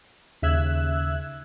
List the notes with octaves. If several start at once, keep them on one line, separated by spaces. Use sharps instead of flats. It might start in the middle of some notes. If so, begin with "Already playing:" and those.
D#2 C#3 E5 E6 F#6 G#6